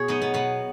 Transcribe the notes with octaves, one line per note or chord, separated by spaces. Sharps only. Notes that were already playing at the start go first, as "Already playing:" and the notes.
Already playing: B2 G#4 C#5
F#3 B3 D#4
B3
B2 B3